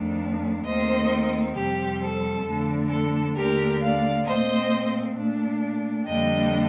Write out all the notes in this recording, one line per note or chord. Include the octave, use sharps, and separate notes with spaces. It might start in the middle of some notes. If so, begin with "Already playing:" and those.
Already playing: F2 D#3 A3 D4
D#2 D#3 A3 C4 C5 D#5
F2 C3 G3 C4 G4
A4
F2 D3 A3 D4
A4
D#2 D3 A3 D4 G4 A#4
D5 F5
A#2 A3 C4 C5 D#5
A#2 A3 D4
F2 D3 G3 A#3 D4 D#5 G5